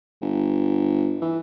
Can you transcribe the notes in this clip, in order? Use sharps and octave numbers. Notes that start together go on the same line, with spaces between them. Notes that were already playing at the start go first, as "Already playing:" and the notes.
G1
E3